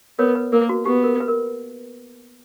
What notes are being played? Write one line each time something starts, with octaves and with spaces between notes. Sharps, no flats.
B3 A#4 C#5
B4
A#3 A#4
F#4
B3 G4
A#4
B4
A#4